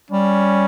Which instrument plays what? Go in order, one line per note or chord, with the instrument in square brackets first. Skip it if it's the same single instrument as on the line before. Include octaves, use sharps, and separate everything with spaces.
[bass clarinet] G3 [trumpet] C#4